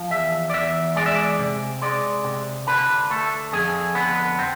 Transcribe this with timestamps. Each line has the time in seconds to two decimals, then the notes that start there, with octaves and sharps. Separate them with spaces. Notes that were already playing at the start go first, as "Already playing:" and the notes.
Already playing: F3
0.10 E2 E5
0.50 D5
0.53 E2 E5
0.96 G#3 D5
1.06 E5
1.16 D5
1.39 C3
1.82 G#3 D5
2.24 C3
2.67 D3 B4
3.11 A3 A4
3.53 F2 G#4
3.95 D3 B3
4.39 C4